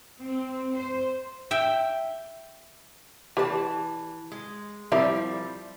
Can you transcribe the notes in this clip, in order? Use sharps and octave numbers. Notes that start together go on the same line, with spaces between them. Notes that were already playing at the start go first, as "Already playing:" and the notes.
C4
C5
E5 G5
E3 G4 B4 D5 A5
G#3
F3 G3 C4 E4 A#4 D5